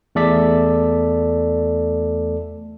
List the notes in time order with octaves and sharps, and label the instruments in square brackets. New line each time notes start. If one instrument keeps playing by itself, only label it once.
[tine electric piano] E2 A3 A4 D5 B6